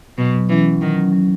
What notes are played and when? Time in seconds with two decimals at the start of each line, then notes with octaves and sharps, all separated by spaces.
0.18 B2 F#3
0.49 E3 C#4
0.81 D#3 F#3
1.13 F#3